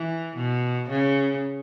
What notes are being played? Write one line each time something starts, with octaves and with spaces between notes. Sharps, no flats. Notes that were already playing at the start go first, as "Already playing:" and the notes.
Already playing: E3
B2
C#3